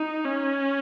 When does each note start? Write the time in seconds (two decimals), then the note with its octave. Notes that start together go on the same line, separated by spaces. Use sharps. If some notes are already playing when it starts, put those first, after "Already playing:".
Already playing: D#4
0.25 C#4